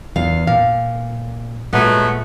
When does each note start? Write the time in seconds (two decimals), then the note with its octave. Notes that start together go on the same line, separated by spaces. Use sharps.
0.16 E2 F5
0.47 A#2 F5
1.73 A#2 F#3 G#3 A3 B3